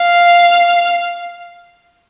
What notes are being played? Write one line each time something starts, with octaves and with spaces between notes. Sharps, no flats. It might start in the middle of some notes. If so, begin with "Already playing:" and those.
Already playing: F5